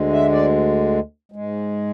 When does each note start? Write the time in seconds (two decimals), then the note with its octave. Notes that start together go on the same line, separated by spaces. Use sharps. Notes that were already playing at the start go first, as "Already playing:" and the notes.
Already playing: D2 D3 G#3
0.13 E5
0.32 D5
1.32 G#2 G#3